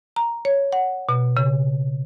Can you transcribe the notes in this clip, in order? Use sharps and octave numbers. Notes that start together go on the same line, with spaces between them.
A#5
C#5
F#5
B2
C#3